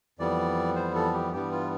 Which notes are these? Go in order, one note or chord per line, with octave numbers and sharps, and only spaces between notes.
F2 E3 G3 B3 D5
C5
A4
G4
G2 E3 G3 B3 G4
F4